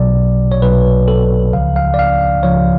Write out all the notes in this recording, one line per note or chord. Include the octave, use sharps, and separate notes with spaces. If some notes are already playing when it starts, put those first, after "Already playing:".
Already playing: B1 B2 F#3 D5
C#5
B1 B2 F#3 B4
A4
C#2 C#3 F3 F5
F5
D5
F5
C#2 C#3 F3 C#5